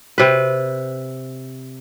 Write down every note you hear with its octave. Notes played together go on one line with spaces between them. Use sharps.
C3 B4